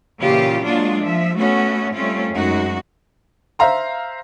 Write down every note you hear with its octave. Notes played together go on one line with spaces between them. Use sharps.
A#2 C#3 E3 F4 G4
F#3 G#3 A#3 D4 F4
F3 E5
A3 B3 C#4 F#4
G3 A3 C4 C#4 F4
F#2 G#3 D#4 F#4
C5 E5 F5 A#5 C6